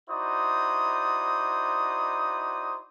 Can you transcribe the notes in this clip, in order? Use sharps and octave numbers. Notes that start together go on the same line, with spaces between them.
D#4 E4 F#4 C5 D5 D#6